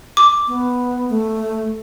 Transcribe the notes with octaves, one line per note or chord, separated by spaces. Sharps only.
D6
B3
A3